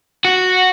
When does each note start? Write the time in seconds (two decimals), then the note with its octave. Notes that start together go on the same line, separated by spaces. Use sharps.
0.25 F#4